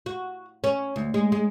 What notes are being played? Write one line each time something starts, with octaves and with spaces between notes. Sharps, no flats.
F#4
C#4
D2
G#3
G#3